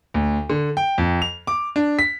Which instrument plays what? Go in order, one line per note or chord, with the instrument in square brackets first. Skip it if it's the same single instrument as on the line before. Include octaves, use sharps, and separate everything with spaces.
[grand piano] D2
D3
G5
F2
F7
D6
D4
B6